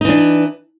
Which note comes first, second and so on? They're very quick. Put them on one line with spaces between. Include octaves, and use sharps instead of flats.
D#4 E3 D4